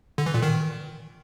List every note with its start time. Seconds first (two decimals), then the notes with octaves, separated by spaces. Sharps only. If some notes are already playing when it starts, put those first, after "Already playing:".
0.18 D3
0.26 E3
0.34 A#2
0.42 D#3